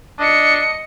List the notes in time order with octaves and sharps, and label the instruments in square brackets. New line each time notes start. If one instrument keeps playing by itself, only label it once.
[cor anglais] D4 [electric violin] D#5 C#7